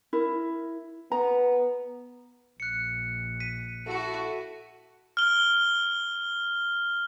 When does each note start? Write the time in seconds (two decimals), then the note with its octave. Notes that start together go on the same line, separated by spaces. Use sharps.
0.13 E4 A#4
1.12 B3 A#5
2.60 A#1 F#6 C#7
3.40 B6 D#7
3.86 E4 F#4 A4
5.17 F6 G7